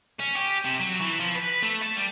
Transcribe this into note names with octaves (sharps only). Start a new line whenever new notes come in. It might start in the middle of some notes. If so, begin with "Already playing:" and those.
C#4
G4
C3
F#3
E3
F3
B4
A3
A5
G3